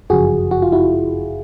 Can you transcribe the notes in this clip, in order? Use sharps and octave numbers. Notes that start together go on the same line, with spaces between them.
G1 F#2 C#3 F3 F#4 G#4
F#4
F4
E4 F#4